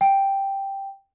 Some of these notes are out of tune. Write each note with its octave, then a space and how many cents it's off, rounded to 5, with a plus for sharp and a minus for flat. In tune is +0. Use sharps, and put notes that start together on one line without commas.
G5 +0